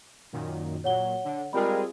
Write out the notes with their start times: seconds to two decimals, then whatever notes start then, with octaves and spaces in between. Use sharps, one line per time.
0.33 F#2 A#2 D#3
0.84 A#2 F#3 C#5 F#5 G7
1.24 D3
1.53 G3 G#3 C4 F4 G#4 A#4 B5